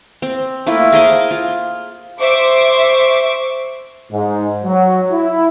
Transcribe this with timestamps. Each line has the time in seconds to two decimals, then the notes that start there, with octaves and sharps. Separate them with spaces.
0.22 C4
0.66 A3 A#3 E4 F4
0.92 G#4 A#4 C5 F5
1.31 F4
2.20 C5 E5 C#6 D6
4.11 G#2
4.64 F#3
5.11 E4